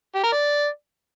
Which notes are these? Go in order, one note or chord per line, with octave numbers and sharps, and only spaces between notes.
G4
A#4
D5